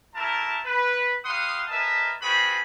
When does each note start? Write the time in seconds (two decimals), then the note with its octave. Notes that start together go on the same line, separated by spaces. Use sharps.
0.14 G3 A3 E4 A#4 A5
0.65 B4
1.25 G3 F5 F#5 C6 D#6
1.69 A#4 B4 D#5 E5 G#5 A5
2.21 C4 F4 F#4 G#4 B4 B5